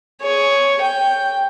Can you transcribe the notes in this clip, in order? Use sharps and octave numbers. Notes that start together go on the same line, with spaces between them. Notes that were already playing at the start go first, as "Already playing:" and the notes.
G#4 C#5
G5